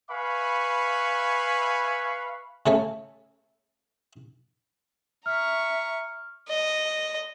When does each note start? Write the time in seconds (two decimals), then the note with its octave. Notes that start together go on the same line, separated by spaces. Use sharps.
0.10 B4 E5 F5 G#5 B5 C#6
2.66 C#3 A3 A4 C#5 G#5
5.26 E5 A#5 C#6 F6
6.49 D#5